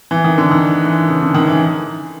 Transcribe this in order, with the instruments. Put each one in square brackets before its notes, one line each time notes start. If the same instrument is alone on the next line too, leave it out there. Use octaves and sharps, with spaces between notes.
[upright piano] E3
D#3
D3
D#3
E3
C#3
D3
D#3
E3